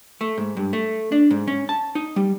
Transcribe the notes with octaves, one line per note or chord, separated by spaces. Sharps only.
A3
G#2
G2
A3
D4
G#2
C#4
A5
D#4
G3